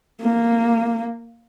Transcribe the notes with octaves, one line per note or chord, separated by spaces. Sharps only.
A#3